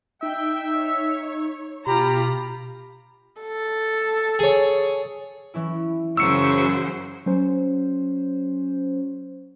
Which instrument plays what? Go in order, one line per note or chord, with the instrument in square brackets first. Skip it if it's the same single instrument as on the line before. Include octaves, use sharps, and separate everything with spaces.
[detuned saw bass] D#4 [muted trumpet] E5 [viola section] G5
[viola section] C#5
[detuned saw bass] B2 [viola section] F4 A#5 [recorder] G4 [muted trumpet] B5
[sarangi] A4
[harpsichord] G#4 C#5
[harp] E3 C#4 E4
[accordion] F#2 C#6 [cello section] C#3 F#3 C5 [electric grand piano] E6 C#7
[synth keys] F#3 C#4 C5